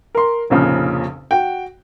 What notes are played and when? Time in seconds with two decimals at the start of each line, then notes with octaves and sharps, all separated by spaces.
0.15 A#4 C6
0.50 F1 A#1 F2 A#2 C#3
1.31 F#4 G5